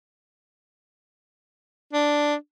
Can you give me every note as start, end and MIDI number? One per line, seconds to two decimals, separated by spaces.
1.93 2.35 62